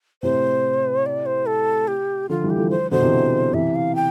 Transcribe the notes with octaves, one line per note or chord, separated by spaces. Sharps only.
A2 C3 C5
D5
C5
A4
G4
D3 F3 F4
E3 G3
G4
F3 A3
C5
B2 D3 C5
C3 E3
C3 E3 E5
F5
G5